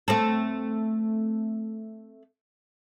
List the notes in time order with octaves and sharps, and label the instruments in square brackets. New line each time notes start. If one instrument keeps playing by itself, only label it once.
[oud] A3 C4 A4